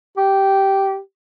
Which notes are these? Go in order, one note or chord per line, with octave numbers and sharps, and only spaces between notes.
G4